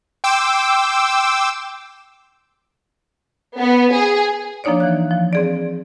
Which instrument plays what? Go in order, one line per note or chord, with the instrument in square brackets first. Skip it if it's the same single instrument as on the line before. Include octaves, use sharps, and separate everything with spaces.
[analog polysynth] G5 C6 D6 E6
[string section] B3
G#4
[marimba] F3 A#3 D4 D#4 C#5 D5
E3 F5 F#6
F3
C4 G#4 D5